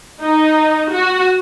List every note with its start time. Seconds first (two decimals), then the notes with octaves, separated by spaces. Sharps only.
0.21 D#4
0.91 F#4